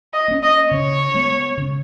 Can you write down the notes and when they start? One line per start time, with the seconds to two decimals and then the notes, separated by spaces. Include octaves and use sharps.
0.13 D#5
0.28 A#3 C#4
0.43 D#5
0.71 C#3 C#5
1.14 G#3 B3
1.57 C#3